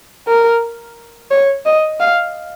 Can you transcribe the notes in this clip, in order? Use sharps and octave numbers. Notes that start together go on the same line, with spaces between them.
A#4
C#5
D#5
F5